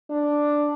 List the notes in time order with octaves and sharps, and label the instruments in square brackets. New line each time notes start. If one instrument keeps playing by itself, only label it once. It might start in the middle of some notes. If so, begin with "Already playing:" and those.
[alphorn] D4